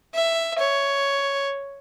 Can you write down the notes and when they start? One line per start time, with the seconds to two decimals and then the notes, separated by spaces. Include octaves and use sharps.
0.15 E5
0.59 C#5